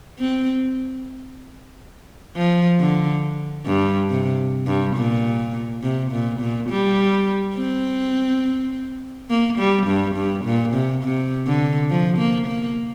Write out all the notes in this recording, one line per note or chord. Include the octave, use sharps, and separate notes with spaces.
C4
F3
D3
G2
C3
G2
A#2
C3
A#2
A#2
G3
C4
A#3
G3
G2
G2
A#2
C3
C3
D3
F3
A#3
A#3